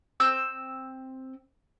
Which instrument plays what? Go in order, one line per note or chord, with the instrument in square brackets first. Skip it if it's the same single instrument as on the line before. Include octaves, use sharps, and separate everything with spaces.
[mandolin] C4 E6 G6